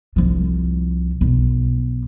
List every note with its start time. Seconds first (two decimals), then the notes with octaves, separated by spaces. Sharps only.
0.16 C2 F3
1.21 B1